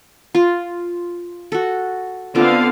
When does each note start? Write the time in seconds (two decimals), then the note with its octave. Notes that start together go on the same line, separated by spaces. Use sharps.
0.35 F4
1.52 F#4 A4
2.35 D3 B3 C4 F4 F5